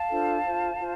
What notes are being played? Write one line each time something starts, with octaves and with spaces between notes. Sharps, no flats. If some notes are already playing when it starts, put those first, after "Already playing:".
Already playing: F5 A5
D4 F4 A4 C5
F4 C5
F4 C5